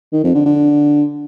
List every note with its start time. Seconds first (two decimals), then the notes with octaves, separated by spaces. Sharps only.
0.13 D#3
0.24 F2
0.35 D3
0.45 D3